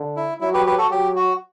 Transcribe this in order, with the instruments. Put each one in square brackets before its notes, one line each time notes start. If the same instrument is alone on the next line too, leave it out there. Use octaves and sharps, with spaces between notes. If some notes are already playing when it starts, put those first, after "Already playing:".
Already playing: [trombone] D3
[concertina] E4
[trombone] F#3 [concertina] E4
[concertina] G4 B4
G4 B4
F#4 A4
[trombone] F#3 [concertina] G4
[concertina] F#4